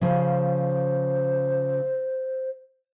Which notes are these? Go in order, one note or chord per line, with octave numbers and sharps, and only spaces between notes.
C#3 F3 C5